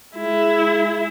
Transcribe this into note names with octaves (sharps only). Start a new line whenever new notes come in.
G#3 E4